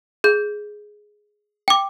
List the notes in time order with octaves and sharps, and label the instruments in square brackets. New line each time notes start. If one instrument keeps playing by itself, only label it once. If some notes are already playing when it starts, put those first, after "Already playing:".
[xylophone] G#4 G6
G5 D6